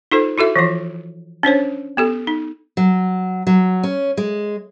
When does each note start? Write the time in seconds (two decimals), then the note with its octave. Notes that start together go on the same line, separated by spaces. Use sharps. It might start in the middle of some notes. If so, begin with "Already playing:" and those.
0.11 D#4 F4 A4 C5
0.38 E4 F#4 A4 E5
0.56 E3 F3 F4
1.43 C#4 D4 C5 C#5
1.97 B3 G4 A4
2.27 D#4
2.77 F#3
3.47 F#3
3.83 C#4
4.17 G#3